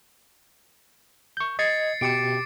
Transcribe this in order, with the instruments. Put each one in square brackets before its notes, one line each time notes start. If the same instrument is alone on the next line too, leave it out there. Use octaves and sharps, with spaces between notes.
[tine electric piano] C#6 G6
[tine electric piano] D#5 G#6 [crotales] A6 C7 C#7
[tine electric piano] B2 G4 [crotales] D6 C#7 D7